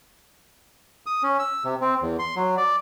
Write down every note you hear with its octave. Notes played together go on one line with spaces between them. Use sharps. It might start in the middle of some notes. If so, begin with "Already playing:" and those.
D#6
C#4
E6
C3
C4
E2
C6
F#3
D5